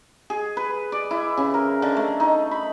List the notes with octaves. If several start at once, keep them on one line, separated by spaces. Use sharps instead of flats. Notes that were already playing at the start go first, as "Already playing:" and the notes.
G#4
B4
D5
E4
C#3
A#4
D3
A3
D#4
B5